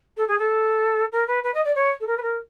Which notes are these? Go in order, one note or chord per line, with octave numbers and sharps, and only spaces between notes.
A4
G#4
A4
A#4
B4
B4
D#5
D5
C#5
A4
A#4
B4
A#4